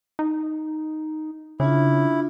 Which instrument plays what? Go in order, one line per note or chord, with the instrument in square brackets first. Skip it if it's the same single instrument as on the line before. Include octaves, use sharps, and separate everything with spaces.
[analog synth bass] D#4
[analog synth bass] C#3 [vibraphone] D4 F4 [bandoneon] E4